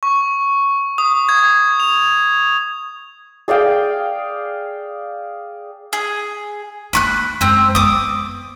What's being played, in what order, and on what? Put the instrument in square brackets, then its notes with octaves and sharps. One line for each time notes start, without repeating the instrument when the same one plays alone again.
[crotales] C#6
D#6
G#6
F7
[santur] G#4 D5 F5 G5
[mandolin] G#4
[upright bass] A3 A#3 [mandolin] B5 C#6 F#6
[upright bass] F#2 G#3 [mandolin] C4 A#5
[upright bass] B3 [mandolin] D6 D#6